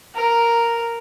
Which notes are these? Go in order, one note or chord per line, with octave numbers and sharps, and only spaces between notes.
A#4